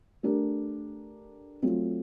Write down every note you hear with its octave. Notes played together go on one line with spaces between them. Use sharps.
A3 D4 G4 A#4
F#3 A3 C4 F4